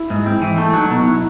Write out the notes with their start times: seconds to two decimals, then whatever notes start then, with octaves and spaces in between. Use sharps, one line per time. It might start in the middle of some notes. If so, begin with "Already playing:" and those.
Already playing: E4
0.10 G#2
0.26 C4
0.42 E3
0.58 A3
0.73 F#3 D#4
0.90 B2 D#4
1.06 E4